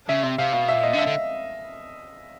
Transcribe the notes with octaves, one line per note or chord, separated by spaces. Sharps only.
C#3 E5
C3 E5
C3 F5
B2 F5
E5
A#2
D#5
D3
E5
D3